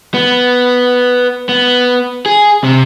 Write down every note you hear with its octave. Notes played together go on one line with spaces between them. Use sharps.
B3
B3
G#4
C3